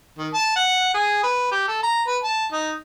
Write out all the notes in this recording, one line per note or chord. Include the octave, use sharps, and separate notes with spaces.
D#3
A5
F#5
G#4
B4
G4
A4
A#5
B4
A5
D#4